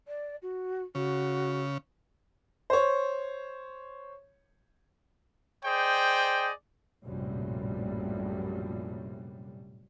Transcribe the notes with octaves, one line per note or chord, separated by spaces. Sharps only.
D5
F#4
C#3 F#4
C5 C#5
G#4 C5 D5 D#5 G5
A#1 F#2 A2 C3 G3